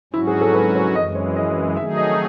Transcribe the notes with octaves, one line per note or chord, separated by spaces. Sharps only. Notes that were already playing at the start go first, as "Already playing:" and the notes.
G#2 F#3 C#4 E4 F#4
G#4
A4
B4
C#5
F#2 E3 G#3 D#5
C#5
D#5
D#3 F#3 A3 D#4 G#4 E5
D#5